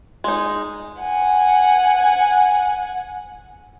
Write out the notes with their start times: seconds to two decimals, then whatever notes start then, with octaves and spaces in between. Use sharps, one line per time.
0.24 G#3 D#4
1.01 F#5 G#5